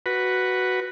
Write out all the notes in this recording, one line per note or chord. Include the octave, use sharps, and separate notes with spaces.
F#4 B4